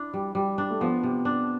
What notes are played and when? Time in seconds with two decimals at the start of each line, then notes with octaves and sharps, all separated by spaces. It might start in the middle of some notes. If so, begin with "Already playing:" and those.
Already playing: D4 E4
0.14 G3
0.35 G3
0.58 D4
0.70 A3
0.81 F3 B3
1.03 C3
1.25 D4